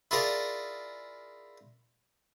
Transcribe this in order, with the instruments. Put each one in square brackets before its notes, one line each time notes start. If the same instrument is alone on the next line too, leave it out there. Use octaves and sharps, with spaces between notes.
[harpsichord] E4 F4 G#4 A#4 D5